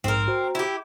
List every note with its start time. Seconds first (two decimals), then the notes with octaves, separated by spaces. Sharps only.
0.04 A#1 G#2 C4 A#4
0.28 F#4 C5 A#5
0.55 E4 G4